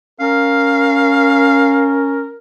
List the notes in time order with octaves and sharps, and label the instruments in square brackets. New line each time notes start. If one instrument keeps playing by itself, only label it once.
[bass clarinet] C#4 [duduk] A#4 [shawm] F5